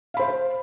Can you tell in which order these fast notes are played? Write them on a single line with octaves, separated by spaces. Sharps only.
F5 B5 C5